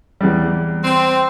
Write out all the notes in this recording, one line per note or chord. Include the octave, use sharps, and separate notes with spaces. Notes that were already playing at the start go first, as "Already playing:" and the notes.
E2 G3
C4